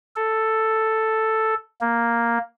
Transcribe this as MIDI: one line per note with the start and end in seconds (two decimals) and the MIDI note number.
0.16 1.54 69
1.81 2.38 58